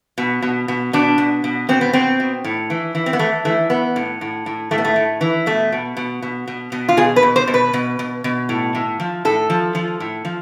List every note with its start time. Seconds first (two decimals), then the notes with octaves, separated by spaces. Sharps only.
0.18 B2
0.42 B2
0.68 B2
0.93 B2 D4
1.18 B2
1.44 B2
1.69 B2 C4
1.81 B3
1.93 B2 C4
2.20 B2
2.44 A2
2.70 E3
2.95 E3
3.06 C4
3.13 B3
3.19 E3 A3
3.45 E3 A3
3.70 E3 B3
3.96 A2
4.21 A2
4.46 A2
4.71 A2 A3
4.78 B3
4.85 A3
4.96 A2
5.21 E3
5.46 B2 A3
5.72 B2
5.97 B2
6.22 B2
6.48 B2
6.72 B2
6.88 F4
6.97 B2 G#4
7.16 B4
7.23 B2
7.36 C5
7.47 B2
7.54 B4
7.73 B2
7.99 B2
8.24 B2
8.49 A2
8.75 A2
9.00 F3
9.25 A2 A4
9.50 F3
9.75 F3
10.00 A2
10.25 F3